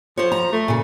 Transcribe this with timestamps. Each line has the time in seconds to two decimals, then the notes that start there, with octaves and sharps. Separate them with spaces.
0.17 F3 C5 C#5
0.32 A#5
0.52 A3
0.68 A#2 C#3